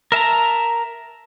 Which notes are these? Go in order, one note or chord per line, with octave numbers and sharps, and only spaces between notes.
A#4 E5 A5 A#5